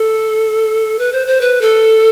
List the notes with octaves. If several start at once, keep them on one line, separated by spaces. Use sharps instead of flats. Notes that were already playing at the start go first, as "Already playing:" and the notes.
Already playing: A4
B4
C5
C5
B4
A4